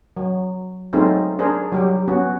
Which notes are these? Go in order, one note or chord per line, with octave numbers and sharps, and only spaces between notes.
F#3
F#3 G#3 A3 C4 D#4 F4
D4 G#4 A#4 C5
F#3 G3 G4
B3 C#4 F#4